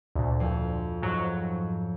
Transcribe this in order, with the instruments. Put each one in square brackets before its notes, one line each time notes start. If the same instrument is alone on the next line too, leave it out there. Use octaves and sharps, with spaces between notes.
[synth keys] D2 A#2
[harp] F2
[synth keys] G#2 F#3